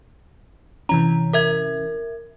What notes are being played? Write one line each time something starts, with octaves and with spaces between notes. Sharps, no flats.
C3 E3 C#4 A#5
A#4 E5 G#6